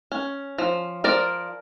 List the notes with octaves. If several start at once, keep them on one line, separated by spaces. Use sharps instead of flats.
C#4
F3
F3 A#4 D5